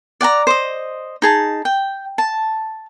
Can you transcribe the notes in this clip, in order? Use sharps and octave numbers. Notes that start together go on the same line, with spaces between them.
D5 F#5 G#5 A#5
C5 D#5
D#4 G#4 A5
G5
A5